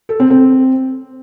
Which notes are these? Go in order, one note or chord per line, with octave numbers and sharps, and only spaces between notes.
A4
C4
C4